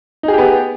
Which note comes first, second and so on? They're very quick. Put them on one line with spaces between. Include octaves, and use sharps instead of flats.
D#4 G#4 G4 B3